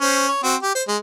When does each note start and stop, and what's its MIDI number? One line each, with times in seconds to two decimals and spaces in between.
0.01 0.28 61
0.01 0.28 72
0.28 0.40 73
0.44 0.55 60
0.44 0.55 66
0.62 0.74 67
0.75 0.83 72
0.88 0.97 56